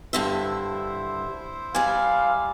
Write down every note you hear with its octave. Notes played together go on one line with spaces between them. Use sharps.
G2 D3 E4 C5 E5
G3 D5 F5 G#5